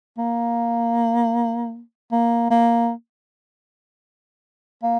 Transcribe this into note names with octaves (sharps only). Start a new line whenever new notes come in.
A#3
A#3
A#3
A#3